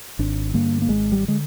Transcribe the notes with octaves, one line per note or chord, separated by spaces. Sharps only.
G#1 D4
G2 D3 A#3
A#3
G#1 G#3
G3
D3 G#3